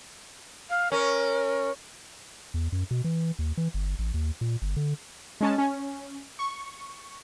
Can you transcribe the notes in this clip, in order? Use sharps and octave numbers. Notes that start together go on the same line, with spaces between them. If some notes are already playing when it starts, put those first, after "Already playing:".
F5
C#4 A#4
E2
F#2
B2
E3
D#2
E3
G1
A1
D#2
A#2
G1
D3
G#3 C#4 A5
C#4
C#6